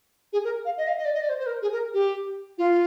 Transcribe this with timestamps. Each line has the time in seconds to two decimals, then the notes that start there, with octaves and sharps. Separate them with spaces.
0.33 G#4
0.44 A#4
0.65 F5
0.77 D#5
0.87 F5
0.98 D#5
1.05 D5
1.14 D#5
1.21 D5
1.29 C5
1.39 C5
1.46 A#4
1.62 G#4
1.72 A#4
1.94 G4
2.58 F4